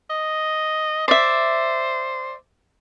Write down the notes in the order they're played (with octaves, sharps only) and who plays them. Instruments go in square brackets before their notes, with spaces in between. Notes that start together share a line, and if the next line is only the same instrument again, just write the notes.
[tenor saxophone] D#5
[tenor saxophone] C5 [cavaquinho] D5 E5